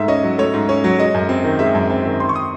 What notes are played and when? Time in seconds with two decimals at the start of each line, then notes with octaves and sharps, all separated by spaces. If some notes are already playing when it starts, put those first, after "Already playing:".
Already playing: G#2 A3 E5
0.08 C#4 D#5
0.23 F#3
0.38 A3 C#5
0.54 G#2
0.69 C#4
0.84 F#3
0.99 G#3 D#5
1.14 F#2
1.29 C4
1.44 D#3
1.59 G#3 E5
1.75 F#2
1.90 C4
2.05 D#3
2.20 D#3 C6
2.29 C#6
2.36 D#6